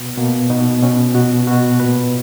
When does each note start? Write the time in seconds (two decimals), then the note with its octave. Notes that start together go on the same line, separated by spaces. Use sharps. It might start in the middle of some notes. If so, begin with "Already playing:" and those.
Already playing: B2 B3
0.18 B2 A#3
0.50 B2 D#4
0.83 B2 C#4
1.15 B2 F#4
1.47 B2 F#4
1.80 A#2 B4